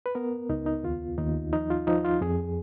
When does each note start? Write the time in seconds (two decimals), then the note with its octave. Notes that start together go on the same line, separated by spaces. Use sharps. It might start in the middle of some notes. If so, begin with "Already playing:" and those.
0.06 B4
0.15 B3 A#4
0.49 C#2 D#4
0.66 D#4
0.83 D#2 F4
1.18 D#2 D#4
1.53 F3 D#4
1.70 F4
1.87 F3 D#4
2.05 F4
2.21 F2 G#4